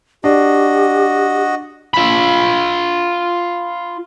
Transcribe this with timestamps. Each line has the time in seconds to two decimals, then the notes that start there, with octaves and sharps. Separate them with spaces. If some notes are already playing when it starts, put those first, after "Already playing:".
0.24 D4 F#4 G4 D#5
1.94 F4 B5